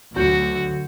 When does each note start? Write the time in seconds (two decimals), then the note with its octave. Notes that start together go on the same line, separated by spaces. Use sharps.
0.16 D2 F#3 F#4 G6